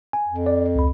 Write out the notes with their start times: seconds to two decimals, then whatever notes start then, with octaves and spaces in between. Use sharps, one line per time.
0.13 G#5
0.28 F2
0.46 D5
0.76 C#2 B5